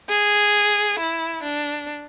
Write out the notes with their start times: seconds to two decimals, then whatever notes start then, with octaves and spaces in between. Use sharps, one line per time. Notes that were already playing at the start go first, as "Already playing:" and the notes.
0.09 G#4
0.99 E4
1.43 D4